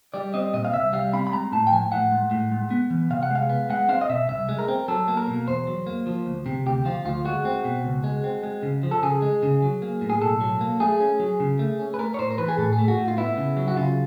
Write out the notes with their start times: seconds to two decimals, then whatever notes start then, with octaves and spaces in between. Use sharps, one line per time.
0.14 G3 D5
0.34 C4 D#5
0.54 A#2 D#5
0.65 F5
0.73 C2 E5
0.93 G3 F5
1.13 C4 B5
1.27 B5
1.32 G#3 A#5
1.52 A2 A5
1.67 G5
1.72 F3 G#5
1.92 A2 F#5
2.12 G#3
2.31 A2
2.52 G#3
2.71 B3
2.90 E3
3.10 C3 F5
3.23 F#5
3.31 G#3 F5
3.49 B3
3.70 G#3 F#5
3.89 C4 F5
4.01 D#5
4.09 B2 E5
4.29 C2 E5
4.49 G#3
4.59 A#4
4.68 C4
4.88 F#3 A4
5.08 A#3
5.17 A#4
5.27 B2
5.47 E2 C5
5.67 F#3
5.87 A#3
6.07 F3
6.26 D2
6.46 C3
6.66 D2 G4
6.85 F3 F4
7.05 D2 F4
7.25 G#3 F#4
7.45 C4
7.64 B2
7.84 C#2
8.04 G#3
8.24 C4
8.43 G#3
8.63 C#3
8.83 F3
8.91 A4
9.02 C#3 G#4
9.22 G#3
9.43 C#3
9.62 F#3
9.82 A#3
10.01 A2
10.10 G#4
10.21 B1 A4
10.41 F#3
10.61 A#3
10.80 A3 G#4
11.00 C#4
11.20 F#3
11.40 C#3
11.59 A3
11.79 C#4
11.94 B4
11.99 A3 A#4
12.14 C#5
12.19 A2 C5
12.30 A#4
12.38 E3 B4
12.48 G#4
12.58 A2 A4
12.73 G#4
12.78 A3
12.88 F#4
12.98 A2
13.08 F4
13.17 B3 E4
13.37 C#3
13.57 F#3
13.68 F#4
13.76 C#3 F4